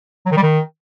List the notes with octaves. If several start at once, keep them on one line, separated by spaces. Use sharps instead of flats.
F#3
D#3
G3
D#3